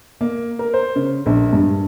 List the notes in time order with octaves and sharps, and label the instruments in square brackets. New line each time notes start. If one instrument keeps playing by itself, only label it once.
[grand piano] A#3
A#4
C5
C#3
A#1
G2